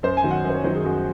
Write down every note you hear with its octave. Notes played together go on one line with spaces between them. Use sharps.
F#2 C5
G#5
D#3 F#3
F#5
F#2 C5
C#5
D#3 F#3 C5
G#4
F#2 F#4